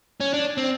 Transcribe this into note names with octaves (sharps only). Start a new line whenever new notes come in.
C#4
D4
C4